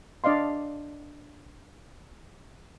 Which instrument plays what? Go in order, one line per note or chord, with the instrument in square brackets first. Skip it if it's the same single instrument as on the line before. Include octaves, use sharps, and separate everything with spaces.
[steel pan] D4 D5 D#5 F5 C6